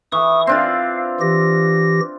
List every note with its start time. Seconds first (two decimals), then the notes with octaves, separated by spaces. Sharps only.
0.12 E3 C#6 D#6
0.47 C4 D4 F4 F5
1.21 E3 G4 A#6